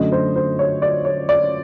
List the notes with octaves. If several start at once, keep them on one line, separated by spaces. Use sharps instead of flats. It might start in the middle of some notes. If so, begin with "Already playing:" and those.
Already playing: F#2 D3 F#3 A3 D#5
C5
C5
C#5
D5
C#5
D5